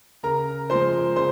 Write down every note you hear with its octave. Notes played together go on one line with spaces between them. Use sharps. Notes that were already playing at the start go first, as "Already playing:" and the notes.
C#3 A#4 A#5
F3 G#3 C5 C6
C#3 C5 C6